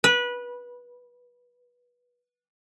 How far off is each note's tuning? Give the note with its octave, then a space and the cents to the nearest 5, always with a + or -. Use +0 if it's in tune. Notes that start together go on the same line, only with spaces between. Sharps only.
B4 -20